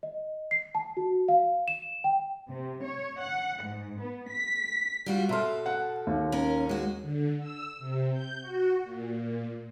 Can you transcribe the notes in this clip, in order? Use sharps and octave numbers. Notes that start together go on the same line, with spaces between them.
D#5
C7
A5
F#4
F5
E7
G5
C3
C#5
F#5
G#2
B3
B6
G3 F4 F#4
B2 A4 E5 C6 F6
F#5
D#2
C#4 A#4
G#3 F#4
D3
E6
C3
G6
F#4
A#2